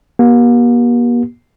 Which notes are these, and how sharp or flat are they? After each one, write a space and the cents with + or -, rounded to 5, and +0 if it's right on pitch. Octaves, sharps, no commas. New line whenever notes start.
A#3 +45 G4 -25